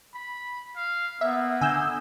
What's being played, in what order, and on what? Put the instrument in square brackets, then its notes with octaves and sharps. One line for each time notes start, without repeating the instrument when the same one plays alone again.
[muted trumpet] B5
F5
[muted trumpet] A#3 [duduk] B3 [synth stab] E5
[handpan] D3 [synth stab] G#5 E6 G6